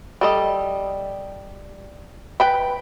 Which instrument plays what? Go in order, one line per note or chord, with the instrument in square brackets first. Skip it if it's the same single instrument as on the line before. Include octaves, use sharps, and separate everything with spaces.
[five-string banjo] G3 A4 D#5
B4 G5 B5